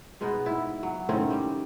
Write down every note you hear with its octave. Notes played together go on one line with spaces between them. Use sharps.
B2 G#3 B3 D#4
G#2 E4
F#3
A2 D#3 C4 C#4
G3